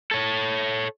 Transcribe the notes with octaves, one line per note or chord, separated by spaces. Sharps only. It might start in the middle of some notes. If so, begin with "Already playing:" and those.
A4 C#5